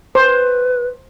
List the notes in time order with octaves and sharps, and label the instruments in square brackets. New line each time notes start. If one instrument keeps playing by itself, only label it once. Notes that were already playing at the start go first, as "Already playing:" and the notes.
[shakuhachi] B4 [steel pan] C5